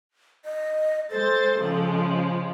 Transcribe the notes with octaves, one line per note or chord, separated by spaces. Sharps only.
D#5
G#3 A4 C5 A6
C#3 F3 G#3